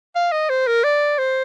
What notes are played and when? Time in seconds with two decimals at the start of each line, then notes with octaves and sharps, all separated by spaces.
0.15 F5
0.32 D#5
0.50 C5
0.67 A#4
0.84 D5
1.19 C5